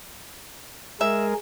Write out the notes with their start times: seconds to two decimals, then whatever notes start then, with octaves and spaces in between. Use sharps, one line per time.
1.01 G#3 G#4 A#4 E5